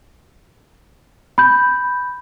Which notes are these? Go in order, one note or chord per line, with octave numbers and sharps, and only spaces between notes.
B5 G6